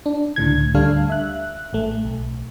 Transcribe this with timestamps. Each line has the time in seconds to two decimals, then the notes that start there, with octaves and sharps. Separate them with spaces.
0.06 D4
0.36 C#2 A2 D3 G#6
0.74 D2 G3 D4 A4 F5
1.10 E5 F#6
1.73 A1 A3
2.05 B1